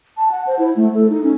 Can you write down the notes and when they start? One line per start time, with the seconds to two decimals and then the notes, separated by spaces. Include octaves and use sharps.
0.17 A5
0.32 F#5
0.47 C5
0.59 E4
0.76 A3
0.95 A4
1.10 D#4
1.24 C#4